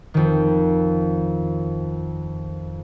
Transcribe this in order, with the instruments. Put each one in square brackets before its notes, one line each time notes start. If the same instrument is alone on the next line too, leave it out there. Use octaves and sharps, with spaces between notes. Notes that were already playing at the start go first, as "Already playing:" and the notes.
[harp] F2 D#3